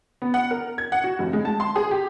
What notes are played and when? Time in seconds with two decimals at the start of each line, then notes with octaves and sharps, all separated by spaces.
0.22 B3
0.34 F#5
0.51 A#4
0.78 G#6
0.92 F#5
1.04 F#4
1.19 F1
1.33 G#3
1.45 A5
1.60 C6
1.76 G#4
1.91 G4